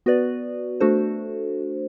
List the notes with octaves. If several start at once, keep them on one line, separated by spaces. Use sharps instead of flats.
B3 F#4 B4 D5
A3 D4 F#4 A4 C5